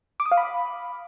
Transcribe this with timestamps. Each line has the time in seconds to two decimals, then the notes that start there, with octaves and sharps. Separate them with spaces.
0.20 D6
0.26 D#6
0.32 F5
0.37 B5